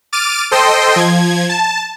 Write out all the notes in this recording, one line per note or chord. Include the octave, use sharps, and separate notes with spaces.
D6 F6 A6 D7 D#7
A4 C5 D#5 G5 C6
F3 G#6
A5